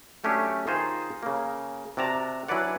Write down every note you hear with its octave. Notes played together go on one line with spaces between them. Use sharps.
F#3 A3 C#4 D4 G4
D#3 D#4 F4 G#4 C5
C#3 A#3
C3 F#4 D5 A5 A#5
E3 F#3 D4 B4 D5 F#5